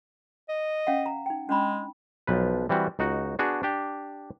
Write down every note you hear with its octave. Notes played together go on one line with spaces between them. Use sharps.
D#5
C#4 F5 F#5
A#5
D#4 G5
G#3 C#4 D4 B5
B1 F3 B4
E3 G3 C4 F#4
C#2 D#4 F#4
B3 D4 F#4 G#4
D4 G4